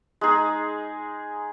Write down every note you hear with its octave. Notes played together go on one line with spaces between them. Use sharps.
G#3 D#4 G#4